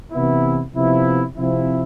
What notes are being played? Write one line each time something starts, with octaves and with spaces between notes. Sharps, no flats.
C3 E3 B3 E4
C3 F3 B3 E4
C3 F3 C4 E4